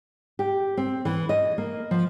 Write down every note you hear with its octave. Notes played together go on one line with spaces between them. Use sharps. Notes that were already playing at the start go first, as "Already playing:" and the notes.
G4
C4
E3
D#5
A#3
F3